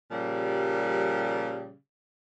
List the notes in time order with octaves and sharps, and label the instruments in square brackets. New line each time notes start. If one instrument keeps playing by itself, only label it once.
[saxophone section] A#2 C#3 F3 G3